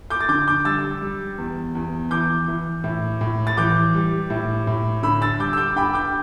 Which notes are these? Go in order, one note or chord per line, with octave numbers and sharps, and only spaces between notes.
D6 G6
A6
D3 D6 G6
D6 G6
G3 E6 A6
G3
E2
E2
E3 D6 G6
E3
A2
A2
A6
E3 D6 G6
G3
A2
A2
D3 B5 E6
E6 A6
G3 D6 G6
E6
D6 G6
G2 G5 B5
D6 G6